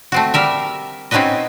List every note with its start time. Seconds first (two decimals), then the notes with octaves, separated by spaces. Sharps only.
0.12 A3 C4 F#4
0.34 G3 A#4 E5
1.11 C4 C#4 D#4 F#4 B4 D#5